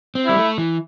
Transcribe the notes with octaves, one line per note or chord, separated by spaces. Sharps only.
C4
G3 E4
A3
E3